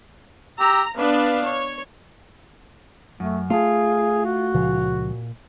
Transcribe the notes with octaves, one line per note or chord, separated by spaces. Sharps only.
G4 A#5 E6
B3 D4 B4 F5
C#5
F#2 A3
A3 F4 G#4
F#4
C#2 A#2 C#3 F3